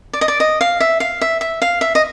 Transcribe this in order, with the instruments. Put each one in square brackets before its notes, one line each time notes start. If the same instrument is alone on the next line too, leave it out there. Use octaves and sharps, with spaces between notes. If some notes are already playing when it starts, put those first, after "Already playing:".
[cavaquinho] D5
D#5
D5
D#5
F5
E5
F5
E5
E5
F5
E5
D#5